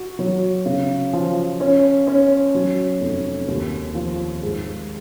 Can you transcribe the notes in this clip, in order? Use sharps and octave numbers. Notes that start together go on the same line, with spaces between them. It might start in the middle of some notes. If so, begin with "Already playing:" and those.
Already playing: F#4
F#3
C#3
F3
C#4
C#4
F#3
F1
D#2
F3
G#2